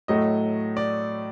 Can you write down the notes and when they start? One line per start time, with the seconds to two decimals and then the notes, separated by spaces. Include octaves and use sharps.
0.08 A2 F#3 A3 D#5
0.77 D5